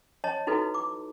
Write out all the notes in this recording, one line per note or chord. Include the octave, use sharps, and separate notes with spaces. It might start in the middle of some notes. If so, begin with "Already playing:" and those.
C#5 D#5 A5
D#4 E4 F#4 A4 B4
D6